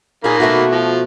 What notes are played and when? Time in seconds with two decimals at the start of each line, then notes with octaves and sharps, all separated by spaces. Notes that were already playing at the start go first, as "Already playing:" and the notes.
0.24 A#2 D#3 A#3 C#4 G#4 B5
0.40 B2 A3 F#4
0.72 F3